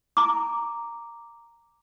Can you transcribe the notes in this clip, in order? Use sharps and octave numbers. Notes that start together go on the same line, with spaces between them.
A#5 D6